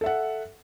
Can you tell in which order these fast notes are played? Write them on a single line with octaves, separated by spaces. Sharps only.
A4 E5 F#5